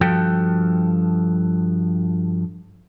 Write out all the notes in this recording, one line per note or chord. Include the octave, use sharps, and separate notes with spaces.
G2 F3 F#4 A4 G5